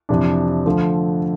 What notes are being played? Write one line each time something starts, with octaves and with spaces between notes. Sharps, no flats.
F2 C3 E3 D4
F2 D3 F3 A3